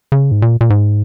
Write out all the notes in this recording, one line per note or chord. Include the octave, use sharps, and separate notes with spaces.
C#3
G#2
A#2
A#2
G#2